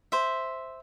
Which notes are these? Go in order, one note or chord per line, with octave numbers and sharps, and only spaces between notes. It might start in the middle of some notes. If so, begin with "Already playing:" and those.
C5 E5